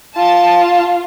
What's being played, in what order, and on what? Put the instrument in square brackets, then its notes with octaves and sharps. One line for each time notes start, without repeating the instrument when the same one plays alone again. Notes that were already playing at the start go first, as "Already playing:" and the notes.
[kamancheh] F4 [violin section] A5